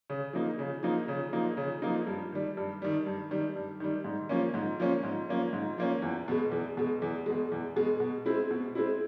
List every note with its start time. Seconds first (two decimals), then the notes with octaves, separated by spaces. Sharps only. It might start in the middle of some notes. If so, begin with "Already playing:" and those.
0.10 C#3
0.33 F3 A#3 D#4
0.59 C#3
0.83 F3 A#3 D#4
1.08 C#3
1.33 F3 A#3 D#4
1.57 C#3
1.82 F3 A#3 D#4
2.07 G2
2.32 D#3 G3
2.57 G2
2.82 D#3 G3
3.07 G2
3.31 D#3 G3
3.56 G2
3.80 D#3 G3
4.04 G#2
4.29 F3 A#3 C#4
4.54 G#2
4.80 F3 A#3 C#4
5.03 G#2
5.29 F3 A#3 C#4
5.53 G#2
5.78 F3 A#3 C#4
6.02 E2
6.28 B2 G#3
6.52 E2
6.77 B2 G#3
7.02 E2
7.26 B2 G#3
7.52 E2
7.76 B2 G#3
8.00 B2
8.26 G#3 C4 E4
8.51 B2
8.75 G#3 C4 E4